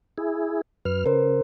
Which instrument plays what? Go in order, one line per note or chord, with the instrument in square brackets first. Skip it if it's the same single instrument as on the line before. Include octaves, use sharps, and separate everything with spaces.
[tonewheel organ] E4 G#4
[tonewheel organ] F#2 F6 [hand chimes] B4
[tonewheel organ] C#3 [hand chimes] A#4 C5